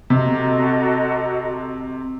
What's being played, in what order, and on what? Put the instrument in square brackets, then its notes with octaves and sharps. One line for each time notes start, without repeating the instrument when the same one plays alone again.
[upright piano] C3 [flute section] F#4 A4 D#5 A#5